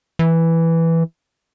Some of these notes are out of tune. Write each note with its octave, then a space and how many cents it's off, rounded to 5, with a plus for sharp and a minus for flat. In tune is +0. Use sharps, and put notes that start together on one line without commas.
E3 +0